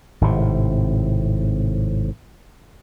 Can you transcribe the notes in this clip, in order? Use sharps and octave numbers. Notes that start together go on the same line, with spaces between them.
G#1 A2 C3